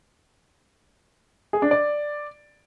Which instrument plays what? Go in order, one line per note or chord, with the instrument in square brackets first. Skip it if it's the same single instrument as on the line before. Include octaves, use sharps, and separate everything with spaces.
[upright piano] G#4
D4
D5